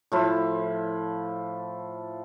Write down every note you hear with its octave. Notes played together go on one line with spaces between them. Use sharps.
A2 F3 E4